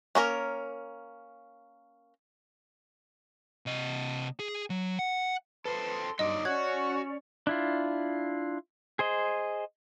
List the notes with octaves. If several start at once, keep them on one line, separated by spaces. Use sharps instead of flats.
A#3 C#4 A#4
C3 D#5
G#4
F#3
F#5
A4 B4 C5 C6
G2 F#3 D#4 D5 D#5
C#4 F#4 C#5 D5 F#5 F#6 G#6
D4 E4 F4
G#4 C5 D#5